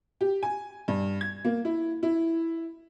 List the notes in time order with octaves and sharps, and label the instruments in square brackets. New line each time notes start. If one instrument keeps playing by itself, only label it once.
[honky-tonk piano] G4
G#5
G2
G#6
A#3
E4
E4